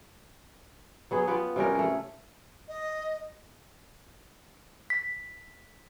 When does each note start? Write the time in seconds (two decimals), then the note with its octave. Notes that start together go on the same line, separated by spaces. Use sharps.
1.11 F#3 B3 G#4
1.28 B3 F4 G4
1.56 C3 G3 C#4 A#4
1.75 A3 G#4
2.68 D#5
4.90 B6